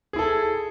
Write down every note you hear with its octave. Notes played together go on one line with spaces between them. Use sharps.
E4 G#4 A4